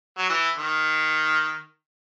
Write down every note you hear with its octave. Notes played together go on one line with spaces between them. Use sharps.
F#3
E3
D#3